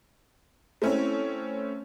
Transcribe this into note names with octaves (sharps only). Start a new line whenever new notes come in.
A3 C4 C#4 E4 C#5